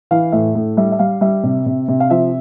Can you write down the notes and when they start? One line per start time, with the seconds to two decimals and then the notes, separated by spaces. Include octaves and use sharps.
0.11 E3 F5
0.32 A2 E5
0.55 A2
0.77 G3 E5
0.92 E5
0.99 G3 F5
1.21 G3 E5
1.44 C3
1.66 C3
1.88 C3
2.00 F5
2.10 F3 E5